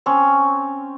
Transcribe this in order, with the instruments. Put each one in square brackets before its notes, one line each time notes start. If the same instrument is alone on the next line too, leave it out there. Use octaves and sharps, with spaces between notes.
[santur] C4 C#4